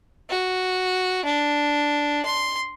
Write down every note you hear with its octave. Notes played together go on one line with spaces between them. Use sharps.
F#4
D4
C6